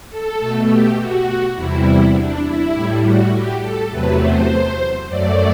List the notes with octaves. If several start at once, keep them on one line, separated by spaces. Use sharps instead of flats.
A4
B2 A3
G4
F#4
E2 C3 G3 E4
D4
E4
A2 G3
F#4
G4
A4
E2 C3 F#3 A3 B4
C5
F#2 F#3 A3 D5